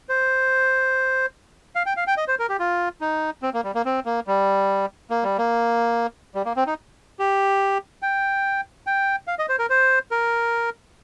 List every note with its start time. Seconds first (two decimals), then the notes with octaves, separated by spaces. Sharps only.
0.09 C5
1.75 F5
1.86 G5
1.97 F5
2.07 G5
2.17 D#5
2.28 C5
2.39 A#4
2.49 G4
2.59 F4
3.01 D#4
3.42 C4
3.54 A#3
3.64 G3
3.75 A#3
3.85 C4
4.05 A#3
4.27 G3
5.10 A#3
5.23 G3
5.38 A#3
6.35 G3
6.45 A#3
6.57 C4
6.67 D#4
7.19 G4
8.02 G5
8.87 G5
9.27 F5
9.39 D#5
9.49 C5
9.59 A#4
9.70 C5
10.11 A#4